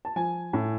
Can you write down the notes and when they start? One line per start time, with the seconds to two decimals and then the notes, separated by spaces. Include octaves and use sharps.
0.05 A5
0.16 F3 G#5
0.53 A2